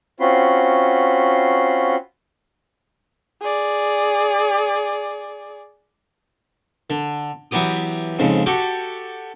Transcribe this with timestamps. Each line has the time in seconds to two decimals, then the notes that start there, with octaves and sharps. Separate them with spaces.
0.20 C4 C#4 F4 F#4 B5 C6
3.42 G#4 D5
6.90 D3
7.51 E3 F#3 B3 G4 D#6
8.19 F2 G#2 C#3
8.46 F#4 G4 A4